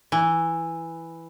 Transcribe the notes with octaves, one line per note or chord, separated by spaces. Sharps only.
E3